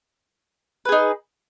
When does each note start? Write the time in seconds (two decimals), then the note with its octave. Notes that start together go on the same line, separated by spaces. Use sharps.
0.85 B4
0.89 G#4
0.92 D#4